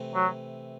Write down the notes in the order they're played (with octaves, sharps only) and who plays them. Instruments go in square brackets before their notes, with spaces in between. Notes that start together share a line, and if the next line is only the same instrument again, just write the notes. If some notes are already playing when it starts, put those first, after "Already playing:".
Already playing: [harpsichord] C3 E3 A3
[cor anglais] F#3